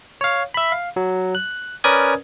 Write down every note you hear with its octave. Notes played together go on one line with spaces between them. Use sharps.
C#5 F5
E5 B5
F5
F#3
F#6
C#4 A#4 B4 D5 D#6 G#6